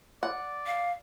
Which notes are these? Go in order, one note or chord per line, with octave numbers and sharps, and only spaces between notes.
D5 F#5
F5